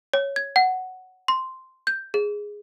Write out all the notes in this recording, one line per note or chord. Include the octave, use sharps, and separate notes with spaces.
C#5
G#6
F#5
C6
G6
G#4